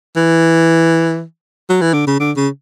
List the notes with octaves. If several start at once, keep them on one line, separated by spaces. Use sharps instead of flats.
E3
F#3
E3
D3
C#3
D3
C#3